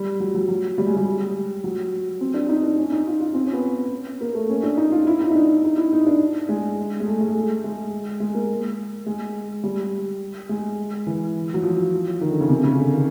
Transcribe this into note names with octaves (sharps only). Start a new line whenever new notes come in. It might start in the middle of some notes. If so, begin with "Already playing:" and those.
Already playing: G3
F#3
F#3
F#3
G3
G#3
G3
F#3
C4
D4
D#4
D4
C#4
D#4
F4
F4
C4
C#4
B3
A#3
A3
C#4
D4
D#4
F4
E4
D#4
D#4
D4
D#4
E4
D#4
D4
G#3
G#3
A3
G#3
A3
G#3
G#3
A#3
G#3
G3
G#3
E3
F#3
F3
D#3
D3
C#3
C3
C#3
D3
D#3